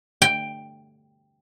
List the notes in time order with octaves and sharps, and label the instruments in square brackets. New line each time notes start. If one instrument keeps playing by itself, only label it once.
[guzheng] G5